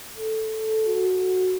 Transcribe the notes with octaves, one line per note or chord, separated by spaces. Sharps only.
A4
F#4